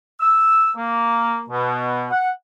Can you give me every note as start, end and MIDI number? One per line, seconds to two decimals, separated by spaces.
0.20 0.70 88
0.76 1.43 58
1.49 2.06 47
2.10 2.29 78